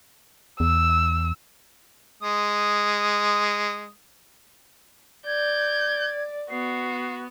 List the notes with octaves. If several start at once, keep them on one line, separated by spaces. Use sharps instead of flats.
E2 E6
G#3 D#6
D5 G6 G#6
B3 F#4 C7